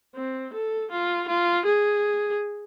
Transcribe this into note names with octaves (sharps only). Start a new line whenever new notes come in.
C4
A4
F4
F4
G#4